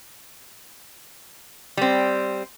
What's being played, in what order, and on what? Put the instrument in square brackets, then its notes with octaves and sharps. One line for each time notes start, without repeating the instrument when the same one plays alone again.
[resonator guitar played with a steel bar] G3 C4